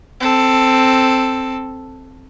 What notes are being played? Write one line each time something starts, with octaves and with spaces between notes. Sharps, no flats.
C4 A4